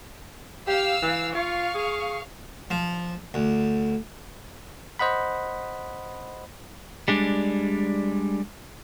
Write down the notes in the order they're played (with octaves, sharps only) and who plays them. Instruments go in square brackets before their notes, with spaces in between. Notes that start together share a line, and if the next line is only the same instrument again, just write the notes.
[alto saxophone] G4 [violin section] F5 E6
[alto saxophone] E3
[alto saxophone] F4 [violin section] F5 C#6
[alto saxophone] G#4
[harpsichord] F3
D2
[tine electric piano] C5 D#5 F#5 B5
[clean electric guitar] G3 G#3 D4